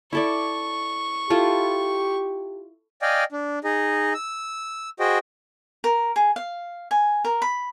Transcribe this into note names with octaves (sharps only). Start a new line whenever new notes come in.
E4 A4 D5 C#6
E4 F4 G4 A4
D5 D#5 F5 G5 G#5
D4
D#4 G#4 D#5
E6
F#4 G#4 C5 D#5 G5
A#4
G#4
F5
G#5
A#4
B5